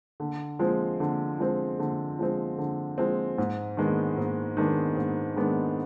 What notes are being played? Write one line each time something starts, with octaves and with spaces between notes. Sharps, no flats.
D3
F3 G#3 C4
D3
F3 G#3 C4
D3
F3 G#3 C4
D3
F3 G#3 C4
G#2
D#3 G#3 B3 D4
G#2
D#3 G#3 B3 D4
G#2
D#3 G#3 B3 D4